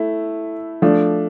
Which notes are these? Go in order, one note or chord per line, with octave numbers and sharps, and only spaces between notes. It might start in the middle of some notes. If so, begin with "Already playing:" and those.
Already playing: A3 E4
F3 A3 D4